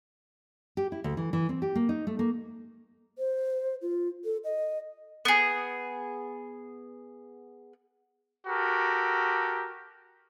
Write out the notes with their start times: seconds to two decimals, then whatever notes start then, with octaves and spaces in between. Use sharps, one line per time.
0.77 G4
0.92 E4
1.04 D2
1.17 E3
1.33 E3
1.49 C4
1.62 G4
1.76 A#3
1.89 D#4
2.07 A3
2.19 A#3
3.18 C5
3.81 F4
4.24 A4
4.44 D#5
5.25 B3 G#4
8.47 F#4 G4 A4 A#4